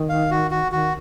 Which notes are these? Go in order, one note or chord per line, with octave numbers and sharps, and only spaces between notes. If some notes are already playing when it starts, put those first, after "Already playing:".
Already playing: D#3
F5
F#4
F#4
D#3 F#4